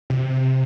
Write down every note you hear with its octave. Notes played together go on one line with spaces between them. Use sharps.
C3